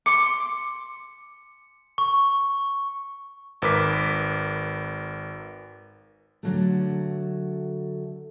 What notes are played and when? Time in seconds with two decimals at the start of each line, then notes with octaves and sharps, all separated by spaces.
0.06 C6 D6 C#7
1.98 C#6
3.62 G#1 A#4 B4 D6 B6
6.43 D3 F#3 A3